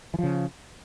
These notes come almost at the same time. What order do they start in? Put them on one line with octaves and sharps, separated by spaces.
E3 F3 C#3